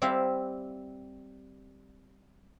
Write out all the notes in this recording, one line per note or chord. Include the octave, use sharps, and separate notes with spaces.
G3 C4 E4 G4 E5 F5